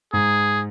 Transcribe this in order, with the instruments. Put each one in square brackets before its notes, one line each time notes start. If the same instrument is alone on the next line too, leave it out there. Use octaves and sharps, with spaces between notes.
[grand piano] G#2 [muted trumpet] G#4